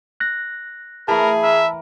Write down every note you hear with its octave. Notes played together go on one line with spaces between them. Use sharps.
F#6 A#6
E3 A3 G#4 A#4 A5 B5
A#4 E5